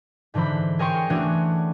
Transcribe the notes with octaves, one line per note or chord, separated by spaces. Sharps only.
G#2 D3 E3 C5 B5
G#4 A#4 C#5 G5 C6 C#6
E3 A3 C#4 D4 F#4 C#5